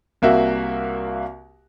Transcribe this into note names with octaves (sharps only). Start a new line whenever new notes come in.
C2 A#3 F#4 E5